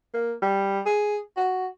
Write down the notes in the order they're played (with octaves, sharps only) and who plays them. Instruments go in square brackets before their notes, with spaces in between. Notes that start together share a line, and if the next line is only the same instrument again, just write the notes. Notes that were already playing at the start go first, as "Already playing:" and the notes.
[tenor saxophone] A#3
G3
G#4
F#4